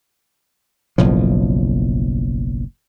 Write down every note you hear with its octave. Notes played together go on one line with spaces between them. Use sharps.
F#1 B1 A2 F3